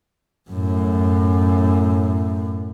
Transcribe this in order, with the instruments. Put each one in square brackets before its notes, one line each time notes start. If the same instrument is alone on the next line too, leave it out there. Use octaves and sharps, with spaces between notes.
[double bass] F#2 A2